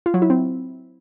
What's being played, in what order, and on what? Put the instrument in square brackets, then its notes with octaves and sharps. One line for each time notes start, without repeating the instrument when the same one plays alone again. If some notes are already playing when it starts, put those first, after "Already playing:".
[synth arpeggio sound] F4
F#3
E4
C4